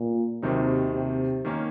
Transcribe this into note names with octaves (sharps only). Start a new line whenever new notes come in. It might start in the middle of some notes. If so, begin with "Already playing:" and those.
Already playing: A#2
D#2 C3 D#3 F#3 C4 D#4
C3
D#3 A#3 C#4